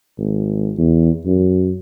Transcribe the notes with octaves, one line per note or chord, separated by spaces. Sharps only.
G#1
E2
F#2